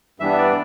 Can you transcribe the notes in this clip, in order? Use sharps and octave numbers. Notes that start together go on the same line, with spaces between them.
G2 E3 G3 B3 D4 E5
D5